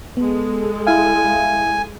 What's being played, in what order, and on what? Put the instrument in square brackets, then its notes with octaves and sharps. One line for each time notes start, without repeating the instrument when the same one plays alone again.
[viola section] G#3 A4 [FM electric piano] B3
[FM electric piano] E4 E5 F5 [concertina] G#5